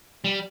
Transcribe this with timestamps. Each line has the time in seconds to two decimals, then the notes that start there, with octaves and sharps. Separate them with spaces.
0.24 G3